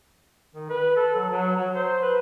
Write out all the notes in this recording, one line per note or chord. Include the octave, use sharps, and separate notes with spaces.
D#3
B4
A4
F#3
F#3
F#3
C5
B4